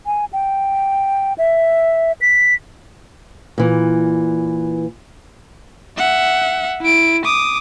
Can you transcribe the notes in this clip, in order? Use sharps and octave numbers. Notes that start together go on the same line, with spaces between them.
G#5
G5
E5
B6
A#2 E3
E5 F#5
E4 D7
D6 D#6